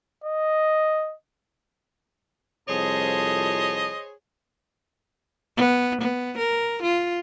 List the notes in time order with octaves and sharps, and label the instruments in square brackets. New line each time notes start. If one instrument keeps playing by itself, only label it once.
[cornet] D#5
[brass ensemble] C2 F2 A5 [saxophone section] G#4 C5 C#5 [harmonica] D#5
[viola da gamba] B3
B3
A#4
F4